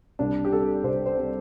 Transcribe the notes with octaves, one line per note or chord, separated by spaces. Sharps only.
C2 D4
G4
C3 G3 A4
C2 C5
C5
C3 G3